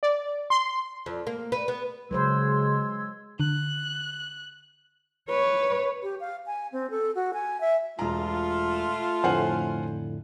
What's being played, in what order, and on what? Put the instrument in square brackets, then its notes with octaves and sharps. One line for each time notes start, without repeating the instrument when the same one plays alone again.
[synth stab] D5
C6
[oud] F2
A#3
B4
B3
[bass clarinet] C#3 [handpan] F#3 B4 C5 [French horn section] G#3 [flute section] C6 E6 G#6
[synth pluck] D3 [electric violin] F#6
[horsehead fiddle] B4 [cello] C#5
[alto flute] G4
F5
G#5
C4
A4
F#4
G#5
E5
[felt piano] E1 A#5 [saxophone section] A3 F4
[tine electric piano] F2 A2 D3 [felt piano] C5 F#5 G#5